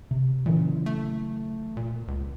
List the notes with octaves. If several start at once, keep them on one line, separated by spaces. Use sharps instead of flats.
C3
A#2 C#3 E3 F#3
A3
A#2
C#2